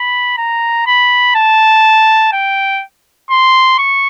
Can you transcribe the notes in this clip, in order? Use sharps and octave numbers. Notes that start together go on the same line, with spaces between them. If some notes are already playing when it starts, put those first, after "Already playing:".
Already playing: B5
A#5
B5
A5
G5
C6
C#6